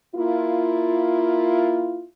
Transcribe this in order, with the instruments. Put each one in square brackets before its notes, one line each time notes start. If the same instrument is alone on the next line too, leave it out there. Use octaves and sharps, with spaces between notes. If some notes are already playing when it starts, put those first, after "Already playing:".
[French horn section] A#3 E4 F4